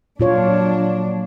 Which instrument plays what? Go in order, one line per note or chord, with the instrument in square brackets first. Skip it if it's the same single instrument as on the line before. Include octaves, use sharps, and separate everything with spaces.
[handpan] A#2 F4 C#5 [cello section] F#3 D4